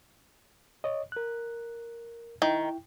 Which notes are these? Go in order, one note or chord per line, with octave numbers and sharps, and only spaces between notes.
C#5 D#5
A#4 F#6
D#3 E4 G5